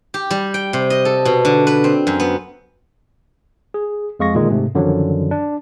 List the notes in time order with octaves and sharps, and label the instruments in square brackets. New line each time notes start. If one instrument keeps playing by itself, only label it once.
[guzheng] G4
G3
G5
C3
D#5
A4
B2
D3
B4
C4
F#2
B3
[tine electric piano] G#4
F2 G#3 F5 C#6 A#6
A#2 D3 D#3 G#3
G#2 C3 A3
F#2 D3 D#3 F3 F#3
D4